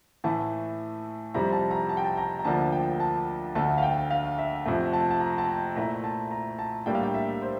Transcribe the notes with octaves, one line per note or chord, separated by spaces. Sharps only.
A2 E3 A3 E4 A5
F2 C3 G3 C4 E4 A#5
A5
A#5
A5
G5
A5
A#5
A#5
D2 D3 F3 A#3 D4 A5
G5
A5
D2 D3 A3 A5
F5
G5
F5
E5
F2 C3 F3 A3
A5
A5
A#5
A5
G5
A#2 A3 E4 A#5
A5
A#5
A5
A2 G3 A#3 D4 G5
F5
G5
E5
C5